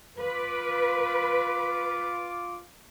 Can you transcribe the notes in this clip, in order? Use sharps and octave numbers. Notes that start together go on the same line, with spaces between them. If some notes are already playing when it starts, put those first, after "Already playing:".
F4 B4 D6